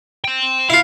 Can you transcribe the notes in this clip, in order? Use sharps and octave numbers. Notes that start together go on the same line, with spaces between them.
G5 C6
E4 F4 F5